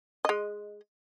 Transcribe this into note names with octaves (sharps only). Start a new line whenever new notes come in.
G#3 D#5